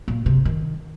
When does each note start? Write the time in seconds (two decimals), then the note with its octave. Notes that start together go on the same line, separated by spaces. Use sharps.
0.08 A#2
0.26 C3
0.45 D#3